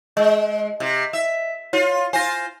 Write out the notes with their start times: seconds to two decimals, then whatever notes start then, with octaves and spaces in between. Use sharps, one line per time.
0.17 G#3 D#5
0.80 C3
1.13 E5
1.73 F4 C#5
2.13 F4 C5 G#5 A#6